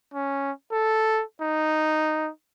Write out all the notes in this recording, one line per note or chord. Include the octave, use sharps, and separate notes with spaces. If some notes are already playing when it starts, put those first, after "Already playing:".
C#4
A4
D#4